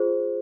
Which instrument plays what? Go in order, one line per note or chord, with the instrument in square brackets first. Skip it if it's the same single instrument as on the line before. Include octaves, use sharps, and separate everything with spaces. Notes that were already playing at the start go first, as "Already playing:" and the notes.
Already playing: [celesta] F4 G#4 C5